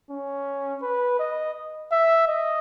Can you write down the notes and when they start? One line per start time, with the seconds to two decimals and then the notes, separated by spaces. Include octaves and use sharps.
0.10 C#4
0.82 B4
1.19 D#5
1.92 E5
2.28 D#5